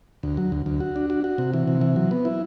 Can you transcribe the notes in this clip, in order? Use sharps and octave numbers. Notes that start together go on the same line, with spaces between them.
D2
F#3
D2
D2
F#4
D4
F#4
F#4
C3
E3
C3
E3
F#3
B3
E4